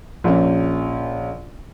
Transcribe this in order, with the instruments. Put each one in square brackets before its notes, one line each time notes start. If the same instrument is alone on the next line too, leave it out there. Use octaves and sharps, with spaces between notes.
[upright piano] A#1 C#4